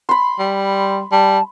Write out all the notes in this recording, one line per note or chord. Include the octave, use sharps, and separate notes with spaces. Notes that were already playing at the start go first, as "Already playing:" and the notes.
B5 C6
G3
G3 A5